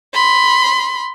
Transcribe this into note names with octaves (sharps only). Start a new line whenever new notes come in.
B5 C6